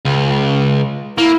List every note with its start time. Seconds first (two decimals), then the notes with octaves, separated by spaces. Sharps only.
0.05 C#2
1.18 A#3 E4